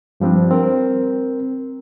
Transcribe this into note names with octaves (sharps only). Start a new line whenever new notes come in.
G2 F3 G3 C4 D4
C4 A#4